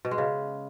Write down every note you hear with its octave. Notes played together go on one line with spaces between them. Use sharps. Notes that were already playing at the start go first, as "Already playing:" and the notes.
B2
G#3
C#3